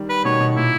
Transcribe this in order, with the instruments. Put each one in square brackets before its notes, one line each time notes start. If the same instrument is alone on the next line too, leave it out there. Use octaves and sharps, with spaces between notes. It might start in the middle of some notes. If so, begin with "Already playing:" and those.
Already playing: [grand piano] D#3 G3
[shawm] B4
[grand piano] B2 D#3 [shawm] C#5
[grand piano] B2
[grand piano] A#2 [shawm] E4